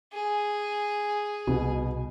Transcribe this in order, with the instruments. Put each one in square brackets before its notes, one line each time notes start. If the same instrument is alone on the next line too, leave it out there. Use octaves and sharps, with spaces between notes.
[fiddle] G#4
[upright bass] C2 [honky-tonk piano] B2